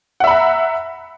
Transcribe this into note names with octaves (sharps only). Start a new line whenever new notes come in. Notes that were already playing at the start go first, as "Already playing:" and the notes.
E5 F#5 A#5 B5